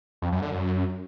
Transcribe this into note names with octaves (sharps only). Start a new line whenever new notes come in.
F2
F#2
D3
F#2